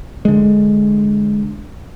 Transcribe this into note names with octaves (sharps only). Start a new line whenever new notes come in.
D3 G#3